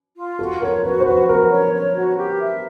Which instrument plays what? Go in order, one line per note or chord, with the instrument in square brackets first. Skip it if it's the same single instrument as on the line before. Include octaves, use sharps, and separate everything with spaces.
[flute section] F4
[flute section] F#4 [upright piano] A4
[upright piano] A#4 [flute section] C#5
[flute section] F#4 [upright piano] B4
[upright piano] C5
[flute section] F#4 [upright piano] B4
[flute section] F#4 [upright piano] A#4
[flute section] C#5
C#5
F#4
G4
E5